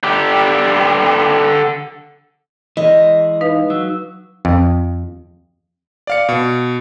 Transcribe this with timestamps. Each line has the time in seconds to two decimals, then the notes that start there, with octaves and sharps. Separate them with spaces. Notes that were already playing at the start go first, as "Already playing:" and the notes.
0.04 D3 G4
2.77 E3 G#3 D#5
3.41 D#4 B4 F5
3.70 F#3 E6
4.45 F2
6.07 D5 F5 C#7
6.29 B2